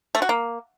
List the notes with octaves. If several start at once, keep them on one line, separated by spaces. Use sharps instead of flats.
A3
F#4
A#3